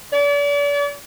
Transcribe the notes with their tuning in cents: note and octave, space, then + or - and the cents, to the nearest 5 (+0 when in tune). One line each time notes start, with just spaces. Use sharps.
D5 -40